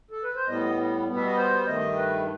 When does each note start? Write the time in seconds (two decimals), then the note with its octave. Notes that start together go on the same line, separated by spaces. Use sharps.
0.11 A4
0.23 B4
0.35 C5
0.47 A2 G3 B3 D#5
1.07 B2 G3 B3
1.17 E5
1.26 D#5
1.37 C5
1.67 G2 D#3 A3 D#5
1.97 B4